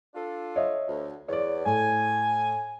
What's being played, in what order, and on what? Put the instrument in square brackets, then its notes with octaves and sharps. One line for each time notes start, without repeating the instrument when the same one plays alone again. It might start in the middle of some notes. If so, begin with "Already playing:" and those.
[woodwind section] D4 F4 A4
[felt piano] C#5 D#5 E5
[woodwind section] D2
[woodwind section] E2 [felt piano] C#5 D5
[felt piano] A2 [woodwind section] G#5